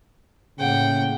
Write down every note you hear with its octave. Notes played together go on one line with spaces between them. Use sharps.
A2 C#3 A#3 F#5 G5